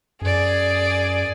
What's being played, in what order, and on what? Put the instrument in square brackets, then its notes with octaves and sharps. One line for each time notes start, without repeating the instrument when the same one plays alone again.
[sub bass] F#2 [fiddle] G#4 D5